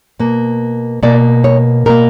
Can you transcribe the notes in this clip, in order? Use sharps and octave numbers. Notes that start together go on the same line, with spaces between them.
B2 A#3
B2 A#3 D5
C#5
B2 A#3 A#4